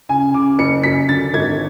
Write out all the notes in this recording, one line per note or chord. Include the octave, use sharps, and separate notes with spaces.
C#3 G#5
C#3 D6
F#1 C#7
F#2 B6
D3 A6
G#1 G#6